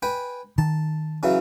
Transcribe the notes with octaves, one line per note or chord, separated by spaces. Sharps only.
B4 G5 G#5
D#3 A5
C#3 E3 F#3